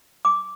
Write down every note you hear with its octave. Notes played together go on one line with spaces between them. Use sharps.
D6